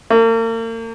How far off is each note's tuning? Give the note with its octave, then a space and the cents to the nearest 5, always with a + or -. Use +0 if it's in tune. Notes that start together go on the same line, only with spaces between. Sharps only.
A#3 -40